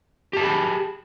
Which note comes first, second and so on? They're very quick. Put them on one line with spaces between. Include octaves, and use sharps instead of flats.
G4 A5 G#4 B5